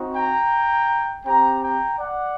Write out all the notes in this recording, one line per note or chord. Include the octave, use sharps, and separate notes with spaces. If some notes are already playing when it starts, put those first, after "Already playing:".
Already playing: C4 D#4 F#4
G5 A#5
C4 G4 G5 A#5
G5 A#5
D5 F#5